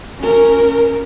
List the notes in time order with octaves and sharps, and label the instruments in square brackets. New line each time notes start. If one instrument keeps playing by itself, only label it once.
[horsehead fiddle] C#4 A#4